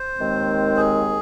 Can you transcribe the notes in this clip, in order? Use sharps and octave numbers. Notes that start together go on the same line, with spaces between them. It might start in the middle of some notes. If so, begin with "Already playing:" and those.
Already playing: C5
D#2 D#3 G#3 C4
G#4